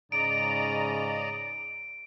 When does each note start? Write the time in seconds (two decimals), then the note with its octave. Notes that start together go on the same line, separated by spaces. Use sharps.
0.12 G#2 C#3 D5 D#5 A#5 D7